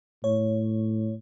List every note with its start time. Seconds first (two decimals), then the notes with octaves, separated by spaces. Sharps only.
0.24 A2 C#5